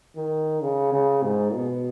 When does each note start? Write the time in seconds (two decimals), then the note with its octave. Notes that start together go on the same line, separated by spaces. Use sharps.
0.16 D#3
0.62 C#3
0.92 C#3
1.23 G#2
1.54 B2